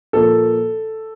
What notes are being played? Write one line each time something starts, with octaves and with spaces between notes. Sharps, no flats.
A#2 F3 A#3 A4